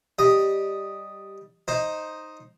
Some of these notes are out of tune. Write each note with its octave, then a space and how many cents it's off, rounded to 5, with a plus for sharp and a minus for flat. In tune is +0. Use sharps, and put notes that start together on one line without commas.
G3 +0 D#5 +0
D#4 +0 C5 +5